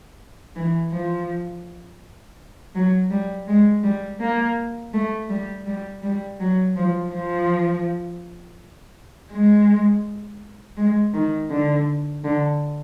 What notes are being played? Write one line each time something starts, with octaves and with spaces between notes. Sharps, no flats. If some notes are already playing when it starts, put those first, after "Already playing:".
E3
F3
F#3
G3
G#3
G3
A#3
A3
G3
G3
G3
F#3
F3
F3
G#3
G#3
D#3
D3
D3